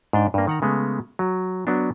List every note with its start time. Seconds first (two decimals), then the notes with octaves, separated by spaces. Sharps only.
0.13 G#2 D4 G5
0.34 G2 A#3
0.47 D#3 F#5 A#5
0.62 C#3 G#3 A3 B3
1.19 F#3
1.67 F#3 B3 D4